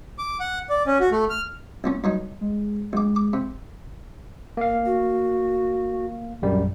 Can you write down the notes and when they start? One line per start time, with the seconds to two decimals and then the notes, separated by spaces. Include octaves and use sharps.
0.19 D6
0.40 F#5
0.69 D5
0.87 C#4
1.00 F#4
1.12 A3
1.30 F6
1.84 C2 A#2 C#4
2.04 G2 F#3 D#4
2.41 G#3
2.93 A#1 G#3 D6
3.16 D6
3.33 C3
4.57 A#3 F5
4.86 F#4
6.42 A#1 F#2 G3